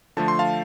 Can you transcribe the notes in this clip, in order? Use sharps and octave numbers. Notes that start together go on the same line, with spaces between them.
D3 F3 A3 A5
C6
F5 A5